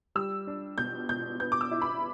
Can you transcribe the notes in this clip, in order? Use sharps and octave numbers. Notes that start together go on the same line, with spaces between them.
G3 E6
D4
B2 G6
B2 G6
B3 G6
D6
E6
E4
B5